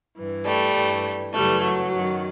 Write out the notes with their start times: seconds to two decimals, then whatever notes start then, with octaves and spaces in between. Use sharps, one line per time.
0.16 G2 E3
0.45 G3 A3
0.74 G2 E3
1.33 F#2 C#3 E3 G3 A3
1.62 F#3
1.93 F#2 D#3